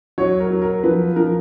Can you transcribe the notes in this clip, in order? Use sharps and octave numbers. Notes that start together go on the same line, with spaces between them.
F#3 C#5
A#4
F#3
A#4
F3 B4
F3 A#4